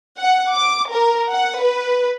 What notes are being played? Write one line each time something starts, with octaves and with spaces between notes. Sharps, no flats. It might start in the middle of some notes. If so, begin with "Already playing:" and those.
F#5
D6
A#4
F#5
B4